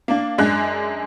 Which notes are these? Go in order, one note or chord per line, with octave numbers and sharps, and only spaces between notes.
A#3 D4
F#2 G#3 D4 F#6